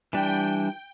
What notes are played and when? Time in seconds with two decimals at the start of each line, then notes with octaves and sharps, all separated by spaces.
0.13 E3 G3 D4 G5